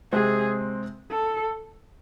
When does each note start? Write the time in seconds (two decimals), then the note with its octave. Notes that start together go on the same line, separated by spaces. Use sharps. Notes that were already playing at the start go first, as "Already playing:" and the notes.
0.12 C3 G#3 C4 G#4
1.12 A4